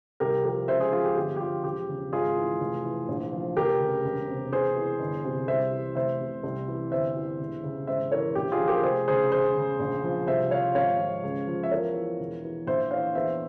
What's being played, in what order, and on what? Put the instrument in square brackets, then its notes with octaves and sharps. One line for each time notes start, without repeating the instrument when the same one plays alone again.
[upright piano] C2 G4 A#4
F3 G4 A#4
C#2 C5 E5
G#4 C5
F3 F4 G#4
G4
G1 G4
G4
F3 F4
E1 G4
C#3
G#1 F4 G#4
E3
F1
E3
A#1
F3
F1 G4 A#4
C#3
E1
C3
E2 G#4 C5
E3
G1
C3
C2 C5 E5
E3
F1 C5 E5
C3
C2
E3
G1 C5 E5
E3
E1
C#3
G#1 C5 E5
E3 A#4 C#5
A#1 G4
F4 G#4
F3
G4 A#4
F1 G#4 C5
C#3 G#4 C5
E1 G#4 C5
C#3
A#1
F3
C2 C5 E5
F3 C#5 F5
G#1 C#5 F5
F3
C#2
F3
E5
E2 A#4 C#5
E3
E1
E3
A#1 C5 E5
E3 C#5 F5
E2 C5 E5